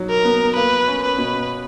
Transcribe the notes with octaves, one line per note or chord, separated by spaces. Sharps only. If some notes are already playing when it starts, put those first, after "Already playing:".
Already playing: B2 F#3 D#4
A#4
B3
A#3 B4
C#4
B4
B2